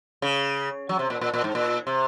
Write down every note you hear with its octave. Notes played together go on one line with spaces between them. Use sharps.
C#3
F#3
C3
A#2
A#2
A#2
G#2
A#2
C3